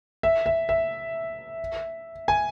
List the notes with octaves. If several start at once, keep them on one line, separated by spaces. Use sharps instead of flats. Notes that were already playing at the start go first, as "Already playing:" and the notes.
E5
E5
E5
G#5